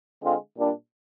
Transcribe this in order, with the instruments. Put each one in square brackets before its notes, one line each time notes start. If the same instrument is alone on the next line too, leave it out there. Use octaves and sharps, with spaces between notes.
[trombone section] D3 G#3 C4 F4
A#2 G3 D4